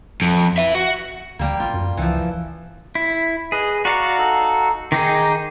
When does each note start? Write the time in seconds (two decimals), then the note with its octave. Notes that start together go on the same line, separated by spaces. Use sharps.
0.22 F2
0.58 B4 E5
0.75 F#4
1.39 D2 G3 A#3
1.60 A#1 F4
1.74 F#2
1.97 C#2 E3 F3
2.95 E4
3.52 G#4 B4 D#5
3.85 F#4 D5 F5 F#5 A#5 C#6
4.18 D#4 A4
4.92 D#3 D#4 G#4 G5 A#5 D6